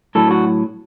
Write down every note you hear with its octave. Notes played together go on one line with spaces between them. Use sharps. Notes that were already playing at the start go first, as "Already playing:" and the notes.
A2 F#3 A4
F#4